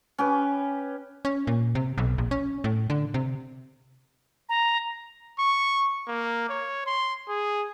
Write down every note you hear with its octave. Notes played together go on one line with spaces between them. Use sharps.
C#4 G4 B4
C#4
A#2
C3
B1
A#1
C#4
A2
D3
C3
A#5
C#6
A#3
C#5
C6
G#4